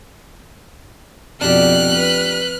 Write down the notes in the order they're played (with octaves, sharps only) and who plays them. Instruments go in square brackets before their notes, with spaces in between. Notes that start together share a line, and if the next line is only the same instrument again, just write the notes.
[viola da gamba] F2 B2 [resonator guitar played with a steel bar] D4 G4 [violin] F6 F#6
[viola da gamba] B4